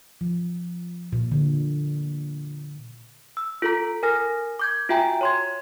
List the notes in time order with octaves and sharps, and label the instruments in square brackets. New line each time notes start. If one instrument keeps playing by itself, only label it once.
[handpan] F3
A#2
D3
[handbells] E6
F4 A4 A#5
A#4 G#5 F6 A#6
D6 G6 G#6
F4 F#4 E5 G5 G#5 A#5
C#5 C6 G#6